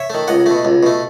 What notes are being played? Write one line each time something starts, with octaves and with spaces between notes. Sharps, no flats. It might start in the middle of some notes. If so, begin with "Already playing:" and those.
Already playing: C#5 E5
D#3 A3
C#2 D#5 F#5
B2 A3
C#2
B2 A3